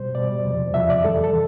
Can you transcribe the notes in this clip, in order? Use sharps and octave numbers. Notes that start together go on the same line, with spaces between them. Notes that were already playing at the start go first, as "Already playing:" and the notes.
Already playing: B2 G3 C5
B2 G3 D5
E2 C3 F3
E2 C3 F3 E5
D5
F2 E3 G3 A4
A4